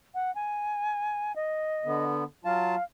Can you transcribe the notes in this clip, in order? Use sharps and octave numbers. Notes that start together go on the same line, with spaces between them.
F#5
G#5
D#5
D3 B3
F#3 F4 F5 A5